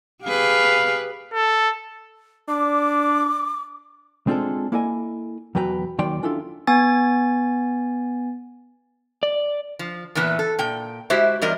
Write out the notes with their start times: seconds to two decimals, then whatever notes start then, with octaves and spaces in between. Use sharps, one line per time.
0.24 G4 G#4 B4 F5
1.34 A4
2.48 D4 D6
4.27 G#3 C4 D4 F4 G#4 A4
4.72 A#3 E4 A4 D5 D#5 G#5
5.55 E2 B2 F#3 B4 G5 A#5
5.98 D#2 D#3 F#3 D5 G5 C6
6.23 C#4 D4 E4 F4 A4
6.67 B3 G#5 A6
9.23 D5
9.79 F3
10.15 E2 A#2 E3 B3 B4
10.39 A4
10.59 A#2 G5
11.10 G#3 E4 F#4 G4 C5 E5
11.42 E2 G3 A#4 D5 D#5